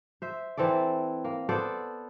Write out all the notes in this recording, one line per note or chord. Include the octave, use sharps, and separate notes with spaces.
C5 E5
E3 C4 A4 D5
A#3
B3 A4 C5 D5